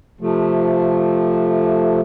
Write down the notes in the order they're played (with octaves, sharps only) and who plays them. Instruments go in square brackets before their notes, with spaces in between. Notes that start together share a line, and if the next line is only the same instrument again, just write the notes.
[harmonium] C3 F3 A3